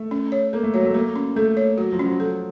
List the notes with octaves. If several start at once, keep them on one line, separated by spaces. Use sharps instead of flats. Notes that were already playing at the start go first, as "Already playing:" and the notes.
Already playing: A3
C#4
C#5
A#3 A4
A3
F#3 C#5
A3
A#3 A4
C#4
A3 A4
C#5
F#3 F#4
F3
C#4
F#3
F#3 A4